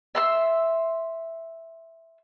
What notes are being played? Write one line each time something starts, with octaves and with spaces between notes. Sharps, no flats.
E5 C6 E6